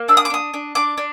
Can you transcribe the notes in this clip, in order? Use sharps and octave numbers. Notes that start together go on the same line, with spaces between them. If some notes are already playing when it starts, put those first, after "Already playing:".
Already playing: A#3
D4 E6
D#6
D6
D4 D#6
D4
D4 D6
D4